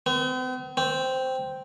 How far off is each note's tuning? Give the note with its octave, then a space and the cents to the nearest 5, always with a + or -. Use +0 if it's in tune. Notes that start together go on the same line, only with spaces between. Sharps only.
C4 -45
C4 -5